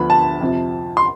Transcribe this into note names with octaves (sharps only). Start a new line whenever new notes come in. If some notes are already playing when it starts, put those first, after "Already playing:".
Already playing: D2 D3 F3 B3 B5
A5
F2 C3 F3
C6